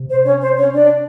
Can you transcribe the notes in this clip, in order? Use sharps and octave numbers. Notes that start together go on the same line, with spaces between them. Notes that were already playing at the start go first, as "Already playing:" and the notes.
Already playing: C3
C5
C#4 C#5
C5
C#4 C#5
D4 D5